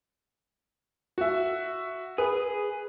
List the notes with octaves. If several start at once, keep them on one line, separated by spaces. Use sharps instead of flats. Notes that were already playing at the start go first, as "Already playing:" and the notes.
F#4 E5
G#4 B4